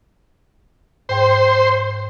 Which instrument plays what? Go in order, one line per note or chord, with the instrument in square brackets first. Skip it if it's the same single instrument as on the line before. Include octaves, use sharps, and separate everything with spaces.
[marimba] G#2 G5 [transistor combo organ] C5